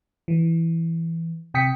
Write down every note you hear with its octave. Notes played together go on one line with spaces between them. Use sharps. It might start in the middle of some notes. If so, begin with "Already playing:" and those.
E3
C3 G5 D#6 B6 C#7